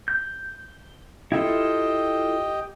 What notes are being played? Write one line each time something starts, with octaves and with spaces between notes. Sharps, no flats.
G6
E4 F4 G4 A4 D#5 G5